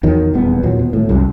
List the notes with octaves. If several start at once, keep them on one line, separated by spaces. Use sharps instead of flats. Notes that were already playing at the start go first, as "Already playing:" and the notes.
E2 D#3 F#3
D#1 E2 B3
D#2 A#2 F#3
B2
G#1 A2
C2 F#2